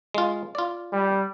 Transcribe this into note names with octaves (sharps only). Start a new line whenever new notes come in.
G#3 F4
F4 D5
G3